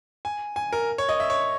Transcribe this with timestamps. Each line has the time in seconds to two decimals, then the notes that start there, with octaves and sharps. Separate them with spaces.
0.25 G#5
0.56 G#5
0.73 A#4
0.98 C#5
1.09 D#5
1.20 E5
1.30 C#5